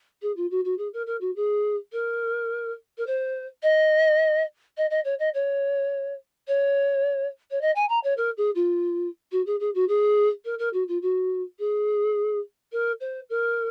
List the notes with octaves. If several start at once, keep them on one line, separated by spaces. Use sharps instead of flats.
G#4
F4
F#4
F#4
G#4
A#4
A#4
F#4
G#4
A#4
A#4
C5
D#5
D#5
D#5
C#5
D#5
C#5
C#5
C#5
D#5
G#5
A#5
C#5
A#4
G#4
F4
F#4
G#4
G#4
F#4
G#4
A#4
A#4
F#4
F4
F#4
G#4
A#4
C5
A#4